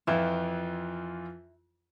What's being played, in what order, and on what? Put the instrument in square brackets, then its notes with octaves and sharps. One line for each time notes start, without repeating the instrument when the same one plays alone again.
[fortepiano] F2 E3 F4 [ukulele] E4